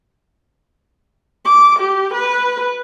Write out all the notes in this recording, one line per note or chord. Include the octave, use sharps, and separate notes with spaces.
D6
G4
B4